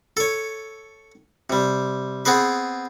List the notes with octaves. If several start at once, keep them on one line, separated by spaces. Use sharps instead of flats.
A4 C#5
C3 G3
B3 C4 G#4 B4